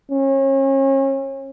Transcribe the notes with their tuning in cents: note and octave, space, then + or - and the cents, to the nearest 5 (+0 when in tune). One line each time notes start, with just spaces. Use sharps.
C#4 -35